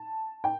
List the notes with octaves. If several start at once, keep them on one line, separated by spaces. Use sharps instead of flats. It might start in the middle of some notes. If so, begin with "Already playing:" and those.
Already playing: A5
G5